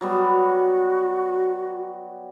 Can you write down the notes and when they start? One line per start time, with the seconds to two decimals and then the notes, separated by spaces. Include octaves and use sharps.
0.01 F#3 G3 B3 F#4